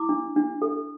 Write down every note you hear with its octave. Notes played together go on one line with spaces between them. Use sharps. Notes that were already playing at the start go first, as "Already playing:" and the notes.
Already playing: E4 D6
D4
D4
A4